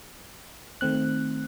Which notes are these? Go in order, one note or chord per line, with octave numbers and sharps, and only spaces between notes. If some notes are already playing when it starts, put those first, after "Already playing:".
D#3 A3 C4 F#6